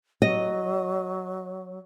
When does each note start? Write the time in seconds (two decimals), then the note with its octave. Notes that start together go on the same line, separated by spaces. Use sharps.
0.22 F#3 D#5